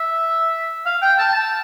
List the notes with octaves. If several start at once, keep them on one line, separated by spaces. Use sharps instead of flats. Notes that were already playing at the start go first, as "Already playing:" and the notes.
Already playing: E5
F5
G5
A5
A5